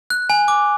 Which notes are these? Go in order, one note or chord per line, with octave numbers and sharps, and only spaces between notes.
F#6
G#5
D6